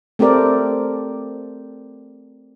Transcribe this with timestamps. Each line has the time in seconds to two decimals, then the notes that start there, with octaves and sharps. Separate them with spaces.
0.19 A3 C4 G4 A#4 D5